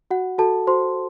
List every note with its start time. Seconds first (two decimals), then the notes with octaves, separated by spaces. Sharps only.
0.11 F#4 F#5
0.38 F#4 A4 A5
0.67 F#4 C5 C6